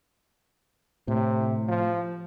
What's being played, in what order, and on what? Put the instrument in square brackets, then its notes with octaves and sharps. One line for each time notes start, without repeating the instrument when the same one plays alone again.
[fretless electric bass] A2 [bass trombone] C3
[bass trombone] F3